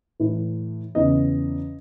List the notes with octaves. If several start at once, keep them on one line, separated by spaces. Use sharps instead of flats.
A2 E3
E2 C#3 E3 D#5